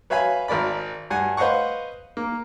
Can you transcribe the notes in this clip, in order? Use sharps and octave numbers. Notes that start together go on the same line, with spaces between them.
B4 C#5 E5 F5 G#5 B5
G#1 A#4 D5 B5
G2 F#5 G#5
B4 C5 D#5 F5 F#5 C#6
A#3